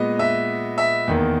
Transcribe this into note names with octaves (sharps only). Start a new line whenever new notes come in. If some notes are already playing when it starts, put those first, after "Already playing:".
Already playing: A#2 G#3 B3 D#5
E5
E5
E2 D#3 A#3